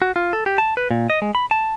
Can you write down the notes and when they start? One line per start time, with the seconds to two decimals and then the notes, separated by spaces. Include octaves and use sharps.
0.02 F#4
0.16 F4
0.33 A4
0.46 G4
0.58 A5
0.77 B4
0.91 A#2
1.10 D#5
1.22 G#3
1.35 B5
1.51 A5